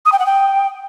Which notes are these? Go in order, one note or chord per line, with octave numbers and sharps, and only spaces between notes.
D#6
G5
F#5
G5